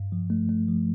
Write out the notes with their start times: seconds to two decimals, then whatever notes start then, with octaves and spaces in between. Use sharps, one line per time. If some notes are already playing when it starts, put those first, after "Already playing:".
Already playing: G2
0.12 F3
0.30 A3
0.49 A3
0.68 F3